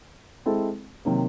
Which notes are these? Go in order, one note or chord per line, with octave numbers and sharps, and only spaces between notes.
G#3 C4 E4 A4
C3 D#3 F#3 A#3